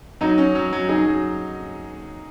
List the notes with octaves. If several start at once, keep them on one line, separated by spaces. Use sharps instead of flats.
F#3 D#4
C#4
F#3
F#3
D#4 G#4
F#3